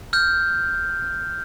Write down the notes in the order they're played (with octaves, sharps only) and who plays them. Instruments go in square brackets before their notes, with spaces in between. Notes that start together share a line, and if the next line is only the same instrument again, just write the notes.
[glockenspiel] F6 G6